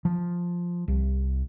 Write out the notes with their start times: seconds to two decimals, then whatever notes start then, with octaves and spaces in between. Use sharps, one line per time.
0.05 F3
0.88 C2